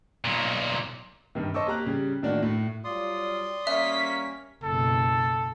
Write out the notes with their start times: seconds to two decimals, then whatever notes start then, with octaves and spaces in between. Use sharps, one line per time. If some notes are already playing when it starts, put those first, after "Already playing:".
0.25 B1 A#2
1.35 G2 C3 D#3
1.54 C5 D#5 A5 C#6 D6 E6
1.67 A#3 G4 A#5 F#6
1.86 C#3 G3
2.23 A2 D#3 A#3 D4 F#4
2.43 A2
2.84 F#3 G3 F4 D5 C6 D#6
3.67 G3 A#3 C#4 E5 B6
4.64 F#1 B2 A4